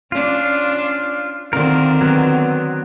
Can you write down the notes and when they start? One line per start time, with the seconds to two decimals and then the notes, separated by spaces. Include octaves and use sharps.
0.12 C#4 D4 F4
1.53 D3 D#3 C4 F4 A#4
2.01 F#3 B3